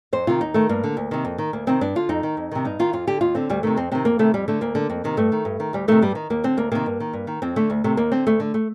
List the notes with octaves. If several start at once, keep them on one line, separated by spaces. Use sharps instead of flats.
F2 C5
C3 D#3 F4
D#2 D#4
D#3 A3
G2 A#3
D3
D2
C3 D#3
F2
D#3
D2 A#3
C3 D#3 C4
G2 D4
D3 F4
F2 D#4
D#3
F2
C3 D#3
G2 D#4
D#3 F4
F2 F4
D3 G4
D#2 F4
D3 C4
D2 G3
C3 D#3 A3
F2 C4
C3 D#3 C4
F2 A#3
C3 D#3 A3
F2 G3
D3 A3
D2 A#3
D3
F2
C3 D#3
G2 A3
D#3
G2
D#3
D2 G3
C3 D#3 A3
G2 G3
D#3
D#2 A#3
D3 C4
D2 A#3
C3 D#3 A#3
G2
D#3
G2
D#3
F2 C4
D3 A3
D2
C3 D#3 A3
D#2 A#3
D3 C4
D2 A3
D3
A3